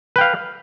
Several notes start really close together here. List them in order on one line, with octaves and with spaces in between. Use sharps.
B4 G5 F5